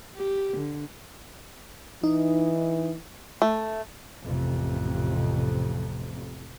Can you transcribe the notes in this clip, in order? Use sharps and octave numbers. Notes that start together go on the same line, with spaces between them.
G4
D3
E3 D#4
A3
A1 F2 C3